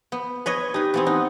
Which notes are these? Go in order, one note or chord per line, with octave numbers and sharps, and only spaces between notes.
B3
B4 C#5 D#5 G#6
D#4 G4 B4
E3 B3 C4
D#4 F#5